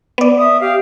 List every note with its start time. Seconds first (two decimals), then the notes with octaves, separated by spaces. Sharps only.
0.18 B3 D5
0.38 E5 D#6
0.60 G4 F5